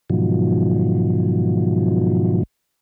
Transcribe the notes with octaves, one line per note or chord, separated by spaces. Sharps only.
G#2 B2 D#3 F3 F#3